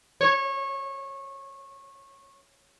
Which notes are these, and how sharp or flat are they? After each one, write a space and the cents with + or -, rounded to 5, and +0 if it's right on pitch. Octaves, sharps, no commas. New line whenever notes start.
C#5 -20